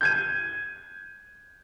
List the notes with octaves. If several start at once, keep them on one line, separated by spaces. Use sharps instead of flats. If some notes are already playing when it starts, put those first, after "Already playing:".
G6 G#6 D#7